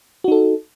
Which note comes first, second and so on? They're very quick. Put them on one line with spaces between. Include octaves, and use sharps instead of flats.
F#4 D#4 A4